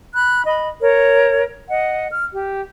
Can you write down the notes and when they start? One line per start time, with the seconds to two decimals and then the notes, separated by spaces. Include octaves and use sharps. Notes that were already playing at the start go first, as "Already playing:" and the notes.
0.14 B5 F#6
0.46 D#5 B5
0.81 A#4 C#5
1.68 D#5 F#5
2.11 F6
2.33 G4